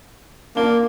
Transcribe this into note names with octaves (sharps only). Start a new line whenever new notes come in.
A#3 D4 F4 G7